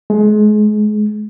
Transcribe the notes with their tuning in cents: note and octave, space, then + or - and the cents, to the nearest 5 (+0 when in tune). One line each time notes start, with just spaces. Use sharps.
G#3 +30